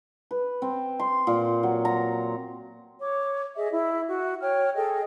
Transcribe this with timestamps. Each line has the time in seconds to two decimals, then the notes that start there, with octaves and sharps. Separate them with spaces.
0.31 B4
0.62 C4
1.00 C6
1.27 A#2
1.63 F#3
1.85 A#5
3.02 C#5 D6
3.56 G#4 D#5 E5
3.72 E4
4.08 F#4
4.41 C#5 G5 F6
4.75 G#4 A4 D#5 G5